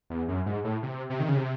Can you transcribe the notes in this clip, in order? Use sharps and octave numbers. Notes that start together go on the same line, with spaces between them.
E2
F#2
G#2
A2
C3
C3
D#3
C#3
C3